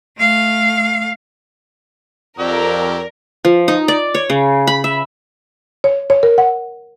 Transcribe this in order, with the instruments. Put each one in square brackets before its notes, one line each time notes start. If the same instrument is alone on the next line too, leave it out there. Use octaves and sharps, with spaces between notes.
[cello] A3 F5
[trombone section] F2 [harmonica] F#3 G4 E6 [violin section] A#4 [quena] D5
[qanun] F3
D#4
D5
C#5
C#3
B5
E5
[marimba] C#5
C#5
A#4
F#5